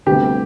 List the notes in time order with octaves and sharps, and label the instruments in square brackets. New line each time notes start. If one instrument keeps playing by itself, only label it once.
[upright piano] D2 C3 G3 B3 [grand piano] G4